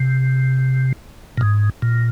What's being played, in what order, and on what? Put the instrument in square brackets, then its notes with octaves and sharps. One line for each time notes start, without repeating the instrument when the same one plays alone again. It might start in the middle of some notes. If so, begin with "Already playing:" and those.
Already playing: [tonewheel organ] C3
A#2
G#2
A#2